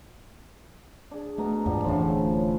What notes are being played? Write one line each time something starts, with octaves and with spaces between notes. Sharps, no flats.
D4 G#4
B2 A3 A#5
E2 G#2 F3 G3 B3
D1 A2 C#3 E3 D4 C5